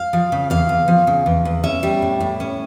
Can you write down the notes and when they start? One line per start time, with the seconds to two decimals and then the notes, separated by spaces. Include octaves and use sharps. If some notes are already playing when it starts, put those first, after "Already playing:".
Already playing: F5
0.13 F3
0.32 C#3
0.50 E2 F5
0.69 E2
0.88 F3
1.07 C#3
1.26 E2
1.45 E2
1.64 C#4 E5
1.83 G3
2.02 A2
2.20 A2
2.40 C#4